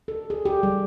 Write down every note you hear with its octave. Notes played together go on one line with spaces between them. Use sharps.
A4
G#4
G4
G3